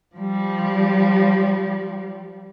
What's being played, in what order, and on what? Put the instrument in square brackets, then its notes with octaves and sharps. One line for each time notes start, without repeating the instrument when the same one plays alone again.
[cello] F3 G3